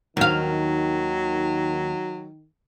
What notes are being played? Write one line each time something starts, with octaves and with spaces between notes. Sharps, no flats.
D#2 D#3 F#3 F5